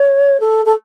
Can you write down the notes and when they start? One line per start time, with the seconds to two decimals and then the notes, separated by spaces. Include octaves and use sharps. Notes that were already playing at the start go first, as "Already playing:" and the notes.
Already playing: C#5
0.40 A4
0.65 A4